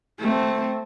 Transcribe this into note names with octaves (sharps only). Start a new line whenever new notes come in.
A3 C4